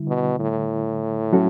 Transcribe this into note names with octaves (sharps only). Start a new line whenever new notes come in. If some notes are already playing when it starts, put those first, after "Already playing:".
Already playing: D3 G3 E4
B2
A2
F#3 C#4 F#4 A4